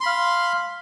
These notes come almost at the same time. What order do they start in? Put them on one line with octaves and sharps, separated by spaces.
C6 B5 F5